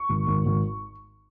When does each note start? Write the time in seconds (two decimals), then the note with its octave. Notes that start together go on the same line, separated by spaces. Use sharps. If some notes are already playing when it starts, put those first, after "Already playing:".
Already playing: C#6
0.09 G#1
0.27 G#1
0.46 G#1